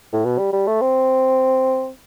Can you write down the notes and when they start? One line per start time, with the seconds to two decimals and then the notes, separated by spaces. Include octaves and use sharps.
0.13 A2
0.25 B2
0.38 G3
0.53 G3
0.67 A3
0.81 C4